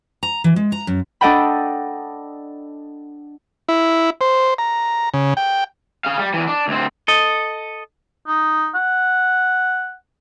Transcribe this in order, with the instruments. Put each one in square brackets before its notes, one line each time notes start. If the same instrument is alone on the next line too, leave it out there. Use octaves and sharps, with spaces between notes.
[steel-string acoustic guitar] A#5
E3
G#3
A#5
F#2
[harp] D4 A4 D#5 F#5 G5 B5
[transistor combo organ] E4
C5
A#5
C#3
G5
[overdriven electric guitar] G#4 F5
G3
E2 E3
D4
D2 C4
[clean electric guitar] A4 D#5
[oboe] D#4
F#5